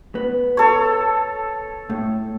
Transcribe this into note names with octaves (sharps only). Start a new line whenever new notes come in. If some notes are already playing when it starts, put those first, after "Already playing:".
B3
A4 C#5
A2